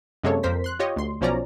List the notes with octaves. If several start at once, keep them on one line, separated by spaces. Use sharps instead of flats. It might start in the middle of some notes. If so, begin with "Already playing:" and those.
F#2 C3 G#3 A#3 A4 C#5
F2 A#4 C5 B6
C6 F#6
F4 G4 C#5 D#5
D2 C6
B1 B2 F3 C#4 D5 A#5